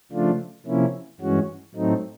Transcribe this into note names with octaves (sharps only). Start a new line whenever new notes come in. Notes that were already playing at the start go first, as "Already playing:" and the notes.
C#3 F3 A3 D4 F4
C3 F3 A#3 C#4 E4
G2 E3 G#3 C#4 F#4
A2 F#3 A3 C4 D#4